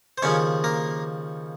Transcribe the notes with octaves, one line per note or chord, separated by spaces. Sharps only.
C5
D#2 C#3 F3 C#4 C#5
A#3 A#4